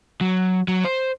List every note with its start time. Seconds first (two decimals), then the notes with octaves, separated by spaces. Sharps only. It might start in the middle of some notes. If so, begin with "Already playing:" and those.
0.21 F#3
0.68 F#3
0.84 C5